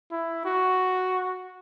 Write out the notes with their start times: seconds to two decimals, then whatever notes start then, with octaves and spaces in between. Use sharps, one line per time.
0.12 E4
0.45 F#4